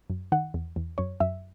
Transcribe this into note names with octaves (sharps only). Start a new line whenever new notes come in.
F#2
D#3 F#5
E2
E2
F#2 C#5
F#2 E5